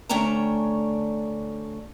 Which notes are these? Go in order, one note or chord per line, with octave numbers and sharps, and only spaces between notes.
D2 A3 C#4 D4 G5 A#5